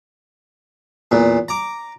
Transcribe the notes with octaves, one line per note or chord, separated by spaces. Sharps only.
E2 A#2
A#5 D6